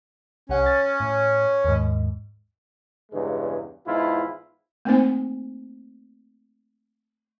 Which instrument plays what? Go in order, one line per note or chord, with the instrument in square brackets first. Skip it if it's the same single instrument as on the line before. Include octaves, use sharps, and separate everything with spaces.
[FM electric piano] C2 F#5 [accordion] C#4
[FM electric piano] A6
A2
D#2 G#2
[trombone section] E2 G2 C#3 G#3
E2 G#2 E4 F4
[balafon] A3 A#3 C4 D#4 C5 G#5